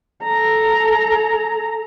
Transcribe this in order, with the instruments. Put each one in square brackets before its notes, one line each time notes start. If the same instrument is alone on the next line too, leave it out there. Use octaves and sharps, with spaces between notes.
[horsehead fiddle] A4 A#5